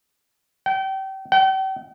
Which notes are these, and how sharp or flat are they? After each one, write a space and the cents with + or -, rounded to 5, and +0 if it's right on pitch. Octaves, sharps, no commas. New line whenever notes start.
G5 -30
G5 -40